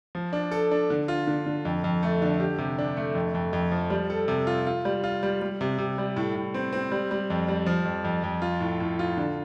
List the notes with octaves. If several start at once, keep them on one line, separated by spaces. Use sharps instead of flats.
F3
D4
A4
D4
D3
F4
D3
D3
F2
F2
A3
D3
G4
C3
D4
A3
F2
F2
F2
F3
G3
A4
C3
F4
F4
G3
F4
G3
G3
C3
C3
G3
A2
A2
C4
C4
G3
G3
F2
G3
F3
F2
F2
F2
F4
A2
A2
F4
D3